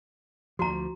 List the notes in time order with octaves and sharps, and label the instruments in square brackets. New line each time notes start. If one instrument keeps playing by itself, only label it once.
[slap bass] D2 F3 [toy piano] F#4 A#5